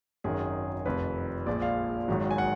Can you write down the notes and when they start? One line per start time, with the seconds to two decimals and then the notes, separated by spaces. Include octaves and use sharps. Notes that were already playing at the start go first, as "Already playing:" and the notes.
0.24 G#1 F#2 D#3 G#3 G#4
0.85 F1 F2 D#3 B4
1.46 A#1 A#2 F3 G#3 D5
1.62 F5
2.08 G#1 G#2 D#3 F#3
2.31 G#5
2.38 F#5